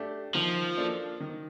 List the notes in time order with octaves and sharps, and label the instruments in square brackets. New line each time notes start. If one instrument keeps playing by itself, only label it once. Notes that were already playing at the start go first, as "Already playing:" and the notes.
Already playing: [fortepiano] A3 D4 G4
[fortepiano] D#3 [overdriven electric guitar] F3
[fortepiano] A#3 D4 A4
D#3